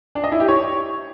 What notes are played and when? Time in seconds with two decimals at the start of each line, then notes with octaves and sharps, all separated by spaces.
0.15 D4
0.24 D#5
0.32 E4
0.40 G4
0.48 C#5